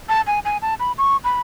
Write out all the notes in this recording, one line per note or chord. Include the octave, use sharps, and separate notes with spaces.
A5
G#5
G#5
A5
B5
C#6
B5